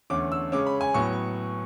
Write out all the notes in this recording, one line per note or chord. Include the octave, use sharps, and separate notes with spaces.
E2 D3 A3 C#4 D6
E6
C#3 G#3 C#4 D6
B5
G#5
A2 F#3 B3 C#6